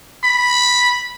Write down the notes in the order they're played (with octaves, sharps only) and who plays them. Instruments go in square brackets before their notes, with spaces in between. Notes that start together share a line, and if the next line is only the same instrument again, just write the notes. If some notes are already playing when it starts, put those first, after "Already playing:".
[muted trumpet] B5